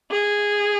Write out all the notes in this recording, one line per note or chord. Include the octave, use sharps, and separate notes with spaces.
G#4